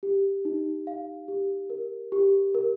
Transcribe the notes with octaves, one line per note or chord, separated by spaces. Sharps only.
G4
D#4
F5
G4
A#4
G4
A#4